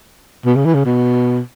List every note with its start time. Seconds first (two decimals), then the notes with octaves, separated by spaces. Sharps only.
0.46 B2
0.56 C#3
0.65 E3
0.75 C#3
0.85 B2